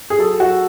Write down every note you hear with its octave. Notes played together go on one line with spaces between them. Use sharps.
G#4
F#3 A4
F#3 F#4